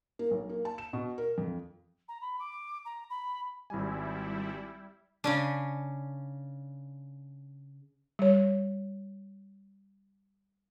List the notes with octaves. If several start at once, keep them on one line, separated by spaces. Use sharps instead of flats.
A#3
B1
A#3
A5
E7
B2
A#4
F2
A#5
B5
D6
A#5
B5
G#1 G3 E4 G#5
C#3 C#4 D4
G3 C#5